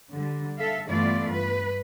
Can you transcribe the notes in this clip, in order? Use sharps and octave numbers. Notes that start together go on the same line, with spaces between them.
D3 G3
A4 E5 F5
G2 E3 A3 B3 F4 D5
G2 B4